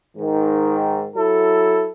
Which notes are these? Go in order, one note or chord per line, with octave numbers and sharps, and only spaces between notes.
G#2 D#3
F#3 E4 A4